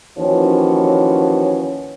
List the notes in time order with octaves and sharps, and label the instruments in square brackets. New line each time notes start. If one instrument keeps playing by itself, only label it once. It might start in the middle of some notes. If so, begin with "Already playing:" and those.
[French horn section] D#2 E3 F3 C#4 F#4 C#5